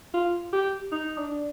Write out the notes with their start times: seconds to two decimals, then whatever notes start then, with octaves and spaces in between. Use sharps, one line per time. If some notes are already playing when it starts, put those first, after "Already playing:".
0.14 F4
0.53 G4
0.92 D#4
1.18 D4